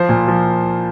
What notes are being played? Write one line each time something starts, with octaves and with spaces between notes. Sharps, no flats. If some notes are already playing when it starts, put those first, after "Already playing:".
Already playing: F3 C5
A#2
F3